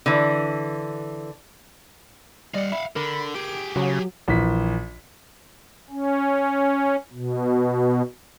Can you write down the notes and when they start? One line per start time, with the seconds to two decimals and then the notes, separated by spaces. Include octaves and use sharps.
0.06 D3 E3
2.54 G3 D5 D#5 F5 F#5
2.72 E5 B5
2.96 D3 A#4 B5
3.35 G4 G#4 D7
3.76 C#3 F#3 F#4
4.28 A#1 E3 B6
5.90 C#4
7.13 B2